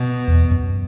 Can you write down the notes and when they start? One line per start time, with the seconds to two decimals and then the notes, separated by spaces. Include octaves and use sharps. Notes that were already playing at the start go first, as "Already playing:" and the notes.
Already playing: B2
0.28 E2
0.51 F#2